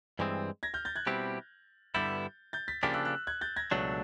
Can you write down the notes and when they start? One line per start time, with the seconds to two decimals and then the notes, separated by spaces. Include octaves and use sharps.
0.19 G2 E3 G#3 C4
0.63 G#6 A#6
0.74 F6 G6
0.85 G6 A6
0.96 F#6 G#6
1.07 B2 G3 C4 E4 G4
1.95 G2 D3 G3 B3 E4 G6 A6
2.53 G6 A6
2.68 A6 B6
2.83 C#3 F3 A#3 D4 G4 A6 B6
2.94 E6 F#6
3.05 E6 F#6
3.27 F#6 G#6
3.41 G6 A6
3.56 G#6 A#6
3.71 C#2 B2 F#3 A3 D4